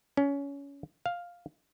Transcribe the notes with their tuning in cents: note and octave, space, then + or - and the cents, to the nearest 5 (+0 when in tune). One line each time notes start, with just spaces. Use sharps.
C#4 +20
F5 +5